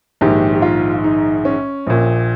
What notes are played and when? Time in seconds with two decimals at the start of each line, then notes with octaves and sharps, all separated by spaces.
0.21 A#1 G#2 D#3 G4
0.53 G4
0.62 F4
1.04 D#4
1.45 C#4
1.87 A#1 A#2